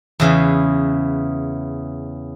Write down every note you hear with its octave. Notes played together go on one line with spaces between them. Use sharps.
E2 C#3 E3